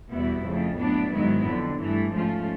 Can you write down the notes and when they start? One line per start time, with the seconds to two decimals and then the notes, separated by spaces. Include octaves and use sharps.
0.11 E2 B2 G3 B3 E4
0.44 F2 C#3 F3 A3
0.77 A2 F#3 B3 D4
1.11 G#2 D#3 F#3 B3 E4
1.44 F2 D3 F#3
1.78 G2 E3 A3
2.11 G#2 F3 A3 C#4 F4